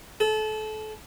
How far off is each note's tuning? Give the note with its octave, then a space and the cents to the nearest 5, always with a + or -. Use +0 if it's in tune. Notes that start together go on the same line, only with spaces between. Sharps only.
A4 -30